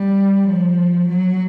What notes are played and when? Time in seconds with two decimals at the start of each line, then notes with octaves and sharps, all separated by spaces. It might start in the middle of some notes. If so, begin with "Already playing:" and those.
Already playing: G3
0.47 F3
1.08 F#3